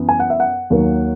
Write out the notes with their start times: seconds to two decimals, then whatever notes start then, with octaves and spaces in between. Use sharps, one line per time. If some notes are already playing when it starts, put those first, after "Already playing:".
Already playing: F#2 E3 B3
0.09 G#5
0.20 F#5
0.30 E5
0.40 F#5
0.70 D#2 D#3 F#3 A#3